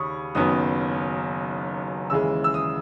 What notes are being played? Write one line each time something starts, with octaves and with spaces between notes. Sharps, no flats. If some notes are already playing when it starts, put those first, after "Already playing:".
Already playing: D#2 C#3 B5 C#6 D#6
F#1 F#2 D#3 F#3 B3 D#6
D#2 C#3 E3 G#3 E6
E6
D#6